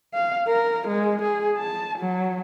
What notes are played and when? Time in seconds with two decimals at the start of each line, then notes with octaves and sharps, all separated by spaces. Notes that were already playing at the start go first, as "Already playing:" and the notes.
0.14 F5
0.48 A#4
0.88 G#3
1.22 G#4
1.57 A5
1.99 F#3